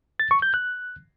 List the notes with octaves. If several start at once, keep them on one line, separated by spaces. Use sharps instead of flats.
A6
C#6
G6
F#6